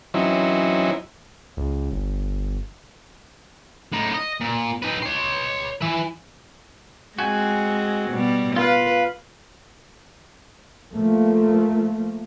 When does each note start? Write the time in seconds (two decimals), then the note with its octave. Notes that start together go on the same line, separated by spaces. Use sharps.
0.14 E3 F#3 C4 C#4 D#4 E4
1.57 C#2
1.91 G1
3.92 A2 D#4
4.14 D#5
4.40 A#2
4.83 D#4 B4
5.03 C#5 C6
5.82 E3 E5
7.19 G#3 C4 F#4 G#5
8.11 B2 G3
8.56 F4 B4 F5
10.92 F3 A3 A#3